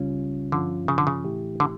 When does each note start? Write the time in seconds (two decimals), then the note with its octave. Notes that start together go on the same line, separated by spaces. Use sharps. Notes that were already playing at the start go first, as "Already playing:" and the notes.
Already playing: C#2 C#3 G3 C#4 F4
0.52 G2 D3 F3 C#4 F4
0.88 C#3
0.98 D3
1.07 C#3
1.24 A2 E3 A3 E4 G4
1.60 D3